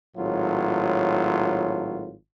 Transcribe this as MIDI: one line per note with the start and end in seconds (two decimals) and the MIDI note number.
0.16 2.15 32
0.16 2.15 45
0.16 2.15 54
0.16 2.15 65